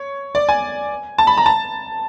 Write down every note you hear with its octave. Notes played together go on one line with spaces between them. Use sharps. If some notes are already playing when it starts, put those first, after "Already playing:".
Already playing: C#5
D5
G#5
A5
B5
A#5
A5